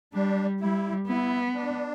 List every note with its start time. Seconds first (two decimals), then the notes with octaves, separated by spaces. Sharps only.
0.13 G3 D4
0.60 G3 E4
1.07 B3 E4
1.54 D4